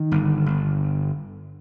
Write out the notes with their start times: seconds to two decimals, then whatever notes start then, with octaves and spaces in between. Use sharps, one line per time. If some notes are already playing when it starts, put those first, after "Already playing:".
Already playing: D#3
0.12 G1
0.46 G1